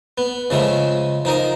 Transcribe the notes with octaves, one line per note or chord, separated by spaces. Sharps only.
B3
C#3 F3 G#3 A3
F3 D#4 A#4 D#5